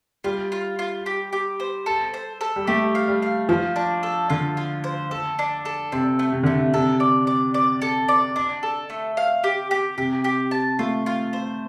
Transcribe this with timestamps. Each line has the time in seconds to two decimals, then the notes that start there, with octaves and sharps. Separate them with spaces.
0.24 G3 F4
0.52 F4
0.79 F4
1.06 G4
1.33 G4
1.60 C5
1.86 A4
2.14 C5
2.41 A4
2.56 G3
2.67 A3 G4
2.95 F5
3.08 G3
3.22 F5
3.49 F3 C5
3.76 D4
4.03 A4
4.30 D3 F4
4.57 F4
4.84 C5
5.11 A4
5.39 D4
5.65 A4
5.92 C3 C4
6.19 A3
6.32 C3
6.43 D3 A3
6.56 C3
6.73 C3 A4
7.00 D5
7.27 D5
7.54 D5
7.82 A4
8.08 D5
8.36 D4
8.63 A4
8.90 A3
9.17 F5
9.44 G4
9.71 G4
9.98 C3 G4
10.24 G4
10.51 A5
10.79 A3 F4
11.06 F4
11.33 C5